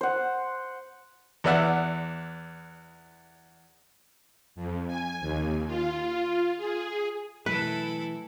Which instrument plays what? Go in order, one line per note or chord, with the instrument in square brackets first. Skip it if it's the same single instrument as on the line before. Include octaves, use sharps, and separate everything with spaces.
[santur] C5 F#5
[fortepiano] E2 B3 D5 E5 F#5
[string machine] F2
G#5
D#2
F4
G#4
[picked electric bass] B2 F#3 A3 [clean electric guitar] E3 [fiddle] E4 A4 [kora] B4